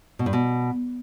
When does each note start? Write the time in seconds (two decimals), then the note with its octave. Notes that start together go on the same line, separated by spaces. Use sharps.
0.19 B2
0.26 G2
0.33 B2